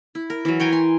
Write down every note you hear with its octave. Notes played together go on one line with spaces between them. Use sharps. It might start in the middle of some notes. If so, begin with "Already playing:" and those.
E4
A#4
E3 F#3
C#5 G5 G#5 A#5
C6